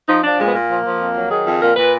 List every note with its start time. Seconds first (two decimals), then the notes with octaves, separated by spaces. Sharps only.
0.08 F3 D#4
0.24 F3 D4
0.39 A#2 G#3
0.48 B3
0.54 A#2 A#3
0.70 F3
0.85 F3
1.00 F2
1.16 F#3
1.30 D#3 G#4
1.46 F2
1.61 A#2 A#4
1.76 A#2 B4